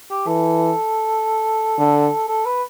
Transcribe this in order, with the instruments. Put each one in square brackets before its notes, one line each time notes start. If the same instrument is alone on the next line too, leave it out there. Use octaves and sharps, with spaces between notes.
[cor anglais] G4
[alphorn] E3 [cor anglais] A4
[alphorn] D3
[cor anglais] A4
B4